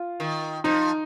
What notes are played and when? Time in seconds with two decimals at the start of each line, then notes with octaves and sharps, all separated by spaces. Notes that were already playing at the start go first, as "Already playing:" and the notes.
Already playing: F4
0.20 D#3
0.64 F3 D#4